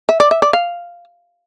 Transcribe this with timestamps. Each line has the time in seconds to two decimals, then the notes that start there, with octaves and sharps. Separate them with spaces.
0.09 E5
0.20 D5
0.31 E5
0.42 D5
0.53 F5